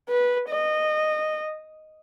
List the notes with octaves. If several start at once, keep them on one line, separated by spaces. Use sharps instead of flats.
B4
D#5